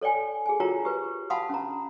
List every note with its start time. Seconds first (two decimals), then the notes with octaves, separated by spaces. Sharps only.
0.01 A4 C#5 D5 G5 G#5
0.46 G#4 G#5
0.60 F4 F#4 A#4 C#5 G5 A#5
0.85 G4 B4
1.30 F5 F#5 A5 B5 C6 D#6
1.50 C#4 A#5